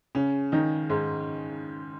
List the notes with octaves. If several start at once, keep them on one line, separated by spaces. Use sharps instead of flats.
C#3 C#4
D#3 D#4
G#2 G#3